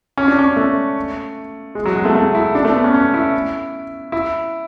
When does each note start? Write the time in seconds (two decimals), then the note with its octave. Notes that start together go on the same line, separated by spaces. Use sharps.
0.18 C#4
0.28 D4
0.39 C#4
0.56 A3
1.75 G#3
1.85 F#3
1.96 G#3
2.05 A3
2.15 A3
2.35 E4
2.55 D4
2.65 A3
2.75 B3
2.84 C#4
2.94 C#4
3.14 E4
4.12 E4